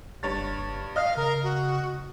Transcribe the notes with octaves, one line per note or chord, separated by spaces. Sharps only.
F#1 G2 C#5 A6
D#5 F5 F6
C#3 A#4
F#4